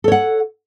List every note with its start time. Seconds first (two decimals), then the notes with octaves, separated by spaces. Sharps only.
0.04 A4
0.08 C#5
0.12 F#5